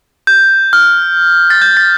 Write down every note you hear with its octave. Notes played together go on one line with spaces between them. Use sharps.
G6
F6
A6
G6
A6